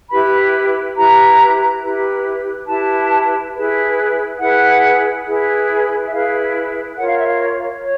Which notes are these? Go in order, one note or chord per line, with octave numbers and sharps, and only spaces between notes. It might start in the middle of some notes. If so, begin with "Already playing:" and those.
E4 G4 B4 B5
E4 G4 B4 A#5
E4 G4 B4
E4 G4 B4 A5
E4 G#4 B4
E4 G#4 B4 F#5
E4 G#4 B4
E5
E4 G#4 B4 F5
F4 A#4 C#5 F#5
F5
E5
F5
C#5